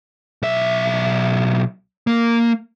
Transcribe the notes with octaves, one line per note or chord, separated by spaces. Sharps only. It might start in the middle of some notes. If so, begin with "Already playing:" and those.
B1 E5
A#3